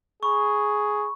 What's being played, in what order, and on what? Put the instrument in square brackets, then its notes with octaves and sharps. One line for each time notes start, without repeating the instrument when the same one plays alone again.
[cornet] G#4 [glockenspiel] B5 C#6